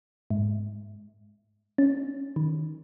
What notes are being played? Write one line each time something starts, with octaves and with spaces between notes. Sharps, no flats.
G#2
C#4
D#3